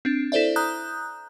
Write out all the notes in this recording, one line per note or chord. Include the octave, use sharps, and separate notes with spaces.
C4 D4
E4 A4 C5 D5 E5
A#5 D#6 F#6 G6